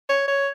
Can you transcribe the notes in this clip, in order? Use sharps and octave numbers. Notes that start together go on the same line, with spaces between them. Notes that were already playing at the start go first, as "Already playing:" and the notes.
C#5
C#5